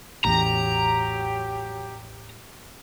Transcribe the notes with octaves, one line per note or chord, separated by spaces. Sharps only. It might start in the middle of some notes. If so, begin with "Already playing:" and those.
A1 E2 F#3 G4 A#5